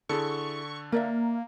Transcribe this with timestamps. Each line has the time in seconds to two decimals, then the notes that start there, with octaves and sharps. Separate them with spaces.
0.09 D3 E4 G#4 A4 C#6
0.92 A#3 A#4 D5 E5